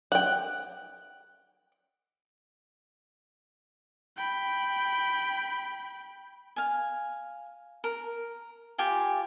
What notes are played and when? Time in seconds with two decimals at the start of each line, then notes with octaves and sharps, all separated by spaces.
0.12 F#5 G5
4.17 G5 B5
6.56 F5 G#5
7.84 A#4
8.78 F4 G4 G5 G#5